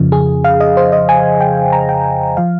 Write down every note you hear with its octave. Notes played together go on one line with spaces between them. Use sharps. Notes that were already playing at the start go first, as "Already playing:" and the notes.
Already playing: F2 C#3 F3
G#4
F5
D#5
C5
D#5
G#5
G5
A#5
G5
F3 F5